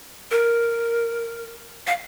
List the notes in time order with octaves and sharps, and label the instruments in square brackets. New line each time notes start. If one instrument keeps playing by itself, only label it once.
[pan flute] A#4
F5